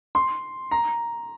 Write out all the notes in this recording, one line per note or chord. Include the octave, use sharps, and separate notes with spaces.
C6
A#5